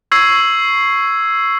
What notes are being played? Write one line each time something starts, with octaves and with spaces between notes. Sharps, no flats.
C#6 E6 G#6 C7 F#7